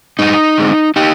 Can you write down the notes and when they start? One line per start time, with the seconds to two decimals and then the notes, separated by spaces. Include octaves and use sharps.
0.19 G2 D#4
0.58 D3 G#3 C4
0.96 D#4 G4